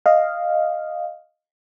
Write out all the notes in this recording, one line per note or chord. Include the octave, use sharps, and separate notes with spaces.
D#5 F5